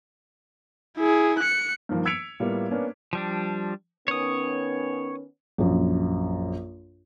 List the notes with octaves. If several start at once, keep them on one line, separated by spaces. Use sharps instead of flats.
E4 G#4
F#6 C#7
G2 D#3 F3 A#3
E6 G#6 B6 C#7 D7 F7
A2 G3 A#3 B3 F4
A#3 B3 C#4 D4
F3 G3 D4
D#3 B3 C#4 C#5 D#6
A#1 F#2